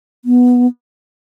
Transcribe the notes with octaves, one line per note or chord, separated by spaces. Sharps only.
B3